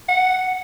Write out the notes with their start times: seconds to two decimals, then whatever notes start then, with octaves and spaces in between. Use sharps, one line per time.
0.09 F#5